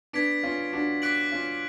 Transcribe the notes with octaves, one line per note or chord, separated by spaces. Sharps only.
B3 D4 G#6 B6 D7
C#4 F4
D4 F#4
D6 F#6 B6 D7 F#7
C#4 F4